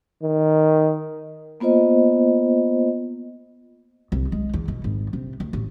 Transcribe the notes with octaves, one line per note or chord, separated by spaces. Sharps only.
D#3
A#3 B3 F4 C5 D#5
C2
G#3
E2
B2
G#1
C3
D2
A1